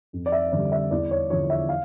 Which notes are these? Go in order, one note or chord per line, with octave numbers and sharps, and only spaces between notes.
F2
D5
E5
D3 G3 D5
E5
E2 D5
C#5
D3 F3 C#5
E5
F5